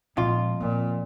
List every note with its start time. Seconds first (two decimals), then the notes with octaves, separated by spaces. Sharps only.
0.17 F2 A#2 G#3 F4
0.60 A#2 C4